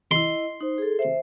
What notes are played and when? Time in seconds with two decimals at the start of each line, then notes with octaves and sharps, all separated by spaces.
0.11 E4 D#5 C6
0.61 D#4 C5
0.78 G#4 A4
0.99 C5 E5